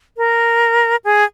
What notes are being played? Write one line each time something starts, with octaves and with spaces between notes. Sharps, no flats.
A#4
G#4